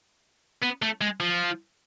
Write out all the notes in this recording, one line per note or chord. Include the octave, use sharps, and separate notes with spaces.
B3
A3
G#3
F3